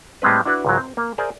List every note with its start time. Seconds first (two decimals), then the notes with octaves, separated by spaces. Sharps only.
0.22 A2 G3 G#3 C4 B4
0.46 D4 E4 F#4 B4 D5
0.65 C#2 G#2 F#3
0.78 C4
0.97 A#3
1.18 G#4 A#4 C5 D5 E5 G#5